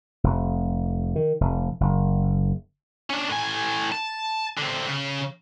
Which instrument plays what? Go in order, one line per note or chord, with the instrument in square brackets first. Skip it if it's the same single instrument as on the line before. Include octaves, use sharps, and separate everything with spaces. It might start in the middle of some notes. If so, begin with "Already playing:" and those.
[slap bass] F1
D#3
F1
F#1
[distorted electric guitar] C#4 D4
A2 G#5
A5
D3 C4
C#3